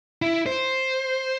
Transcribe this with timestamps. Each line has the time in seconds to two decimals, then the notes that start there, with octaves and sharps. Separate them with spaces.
0.22 E4
0.46 C5